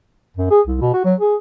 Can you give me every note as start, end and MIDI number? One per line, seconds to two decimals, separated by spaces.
0.37 0.50 42
0.51 0.61 68
0.67 0.81 36
0.81 0.92 47
0.93 1.03 66
1.05 1.14 54
1.20 1.35 68